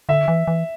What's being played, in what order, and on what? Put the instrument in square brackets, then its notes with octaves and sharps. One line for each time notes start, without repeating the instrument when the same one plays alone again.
[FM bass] D3 [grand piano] E5
[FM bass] E3
E3